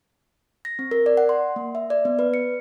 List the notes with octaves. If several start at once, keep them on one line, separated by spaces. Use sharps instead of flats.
A#6
C4
A#4
D5
F#5
C6
A#3
E5
D5
B3
B4
C#7